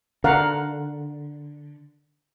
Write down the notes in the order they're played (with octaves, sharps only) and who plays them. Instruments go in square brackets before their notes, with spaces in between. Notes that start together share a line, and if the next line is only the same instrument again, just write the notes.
[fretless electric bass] D3 [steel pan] A#4 F5 F#5